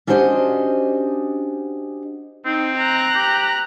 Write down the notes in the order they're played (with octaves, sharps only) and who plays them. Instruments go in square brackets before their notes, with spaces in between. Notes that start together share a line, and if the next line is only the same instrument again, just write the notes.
[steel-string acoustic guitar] C#4 D4 F#4 G4 C5 D#5
[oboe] C4 [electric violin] D#4
[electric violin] A#5 F#6
[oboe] G4